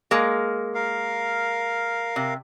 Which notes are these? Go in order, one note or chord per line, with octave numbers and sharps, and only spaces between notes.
G#3 A#3
A#4 F5
C3